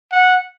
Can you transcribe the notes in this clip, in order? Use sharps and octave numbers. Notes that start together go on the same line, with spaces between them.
F#5